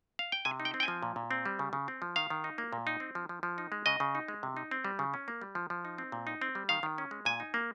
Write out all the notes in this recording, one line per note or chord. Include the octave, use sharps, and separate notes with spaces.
F5
G5
C3 G#5
D#4
G5
C4
G5
G#5
F3
A#2
A#2
C4
G3
C#3
C#3
C4
F3
D#3 F5
D#3
D#4
A#3
A#2
D#4
C4
F3
F3
F3
D#4
G#3
C#3 D#5
C#3
D#4
G#3
C3
D#4
C4
G3
C#3
C#4
A#3
G3
F3
F3
D#4
C4
A#2
D#4
C4
G3
D#3 F5
D#3
C#4
G#3
A#2 G#5
D#4
A#3